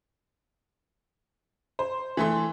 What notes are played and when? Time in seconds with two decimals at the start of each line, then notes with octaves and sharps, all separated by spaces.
1.79 C5
2.17 E3 A3 C6